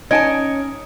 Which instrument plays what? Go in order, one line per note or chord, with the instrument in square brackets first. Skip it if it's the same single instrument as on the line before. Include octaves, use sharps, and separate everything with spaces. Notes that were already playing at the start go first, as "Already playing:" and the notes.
[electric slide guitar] C#4 C#5 [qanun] D#4 [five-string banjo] D#5 G#5 A5 [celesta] G#6 D7